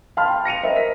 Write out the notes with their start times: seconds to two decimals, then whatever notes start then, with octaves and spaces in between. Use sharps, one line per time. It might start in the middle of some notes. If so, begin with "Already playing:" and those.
0.17 F5 G5 A5 B5 C6 F6
0.30 G5
0.45 A#6 C#7 D#7 F7
0.63 A#4 C5 D#5 E5
0.76 B6